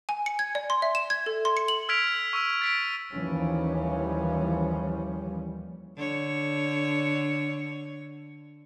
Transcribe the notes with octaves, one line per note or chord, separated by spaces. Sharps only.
G#5
C#7
G#6
D5
C6
E5
E7
G#6
A4
C6
C#7
F#7
E6 F6 G#6 B6 D7 F7
C#6 E6 D#7
A6 B6 D7
D#2 E3 F3 G3 C#4
D3 C#5